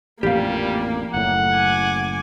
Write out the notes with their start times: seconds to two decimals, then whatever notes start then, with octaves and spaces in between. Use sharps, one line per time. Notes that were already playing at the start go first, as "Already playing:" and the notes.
0.23 A1 F2 A#2 G3 A#3 G4 F5
1.14 F#1 A2 F#5
1.55 G#5 D6